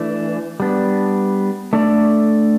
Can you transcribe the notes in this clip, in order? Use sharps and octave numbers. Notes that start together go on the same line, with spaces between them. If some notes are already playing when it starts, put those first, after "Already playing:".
Already playing: E3 A3 D4
G3 B3 D4
A3 D4 A4 D5